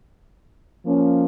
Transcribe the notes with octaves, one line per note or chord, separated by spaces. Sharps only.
F3 A#3 C#4